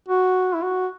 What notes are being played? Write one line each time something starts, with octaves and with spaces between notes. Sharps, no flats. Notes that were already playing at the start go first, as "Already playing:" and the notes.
F#4
E4
F#4